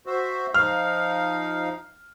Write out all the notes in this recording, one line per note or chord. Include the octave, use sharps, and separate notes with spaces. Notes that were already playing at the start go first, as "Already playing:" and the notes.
F#4 C5 E5
F3 D#4 F5 F6